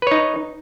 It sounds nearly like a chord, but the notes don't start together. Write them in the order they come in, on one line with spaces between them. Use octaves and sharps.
B4 C#5 D#4